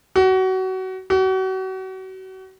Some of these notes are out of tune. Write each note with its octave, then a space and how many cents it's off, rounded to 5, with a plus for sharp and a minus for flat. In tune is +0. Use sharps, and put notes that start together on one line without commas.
F#4 +25
F#4 +35